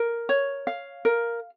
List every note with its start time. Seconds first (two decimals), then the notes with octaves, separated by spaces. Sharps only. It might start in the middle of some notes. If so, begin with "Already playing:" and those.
Already playing: A#4
0.29 C#5
0.67 F5
1.05 A#4